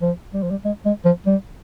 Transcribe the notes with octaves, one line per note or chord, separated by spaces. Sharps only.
F3
G3
F3
G3
G#3
G#3
F3
G3